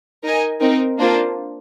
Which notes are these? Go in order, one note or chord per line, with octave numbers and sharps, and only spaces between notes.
D#4 A#4 D#5 G#5
C4 D#4 A#4
A#3 D4 F4 C5